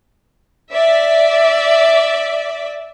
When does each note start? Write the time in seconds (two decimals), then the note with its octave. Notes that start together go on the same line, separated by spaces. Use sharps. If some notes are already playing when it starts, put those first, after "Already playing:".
0.72 D5 E5